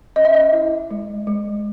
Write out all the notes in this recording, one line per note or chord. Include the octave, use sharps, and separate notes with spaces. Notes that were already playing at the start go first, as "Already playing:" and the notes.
C#4 D#5
E5
D#5
E4
G#3
G#3